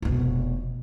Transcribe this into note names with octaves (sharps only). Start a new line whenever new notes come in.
F1 B2